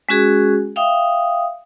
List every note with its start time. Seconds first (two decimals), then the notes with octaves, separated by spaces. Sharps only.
0.09 G#3 C#4 F#4 G#4
0.76 E5 F5 G5 D#6